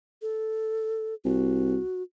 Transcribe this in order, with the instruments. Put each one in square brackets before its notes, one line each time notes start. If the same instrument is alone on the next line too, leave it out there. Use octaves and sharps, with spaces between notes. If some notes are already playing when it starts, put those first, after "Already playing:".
[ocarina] A4
[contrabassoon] C2 [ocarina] F#4